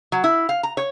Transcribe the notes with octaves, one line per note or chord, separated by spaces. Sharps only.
F#3
E4
F5
A#5
C#5